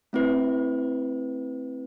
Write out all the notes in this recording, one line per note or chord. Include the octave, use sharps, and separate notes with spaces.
A3 C4 E4 B4